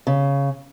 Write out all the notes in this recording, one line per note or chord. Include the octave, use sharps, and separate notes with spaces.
C#3